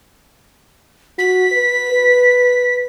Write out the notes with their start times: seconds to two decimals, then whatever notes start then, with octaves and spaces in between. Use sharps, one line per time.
1.19 F#4 B6
1.52 B4
1.93 B4